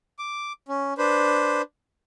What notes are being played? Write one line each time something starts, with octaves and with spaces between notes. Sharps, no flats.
D6
C#4
D4 B4 C5